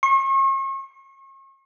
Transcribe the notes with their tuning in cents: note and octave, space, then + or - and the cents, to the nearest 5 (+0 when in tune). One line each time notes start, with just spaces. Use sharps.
C#6 -40